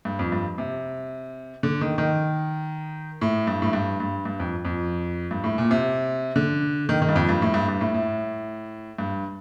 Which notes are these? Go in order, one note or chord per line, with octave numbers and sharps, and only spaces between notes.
G2
F2
G2
C3
D3
D#3
D#3
A2
G2
A2
G2
G2
G2
F2
F2
G2
A2
A#2
C3
D3
D#3
D#3
G2
F2
G2
A2
G2
G2
A2
A2
G2